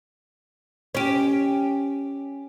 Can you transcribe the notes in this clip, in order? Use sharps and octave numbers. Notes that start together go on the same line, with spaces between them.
C#4 G4